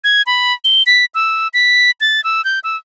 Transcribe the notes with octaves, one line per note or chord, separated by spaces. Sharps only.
G#6
B5
G7
B6
E6
B6
A6
E6
G6
E6